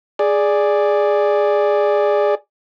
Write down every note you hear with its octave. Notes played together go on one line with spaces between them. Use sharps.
G#4 D5